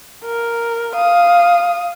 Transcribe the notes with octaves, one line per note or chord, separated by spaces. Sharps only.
A#4
F5 D#6